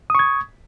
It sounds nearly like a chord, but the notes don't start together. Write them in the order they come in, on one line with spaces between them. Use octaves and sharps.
D#6 C#6 G#6